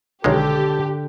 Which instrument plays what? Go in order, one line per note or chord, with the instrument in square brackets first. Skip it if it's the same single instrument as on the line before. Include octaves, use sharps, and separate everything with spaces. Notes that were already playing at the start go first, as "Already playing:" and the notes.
[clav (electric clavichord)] B1 D#3 G#3 [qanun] D3 [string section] G4 [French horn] A4